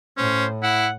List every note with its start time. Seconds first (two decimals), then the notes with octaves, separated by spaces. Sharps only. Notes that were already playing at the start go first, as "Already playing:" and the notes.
0.17 A2 C#4 C5
0.63 E4 F#5